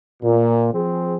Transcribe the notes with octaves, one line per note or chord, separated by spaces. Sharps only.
A#2
F3 C4 G#4